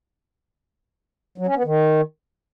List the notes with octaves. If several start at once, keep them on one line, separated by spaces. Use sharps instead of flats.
F#3
C#4
B3
D#3